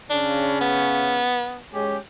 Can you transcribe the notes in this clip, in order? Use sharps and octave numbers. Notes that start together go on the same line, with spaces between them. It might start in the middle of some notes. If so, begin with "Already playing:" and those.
C#3 C#4 D4
B3
G#3 C#4 G4